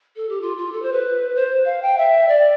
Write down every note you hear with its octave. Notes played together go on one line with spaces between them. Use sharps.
A4
G4
F4
F4
A4
C5
B4
C5
F5
G5
E5
D5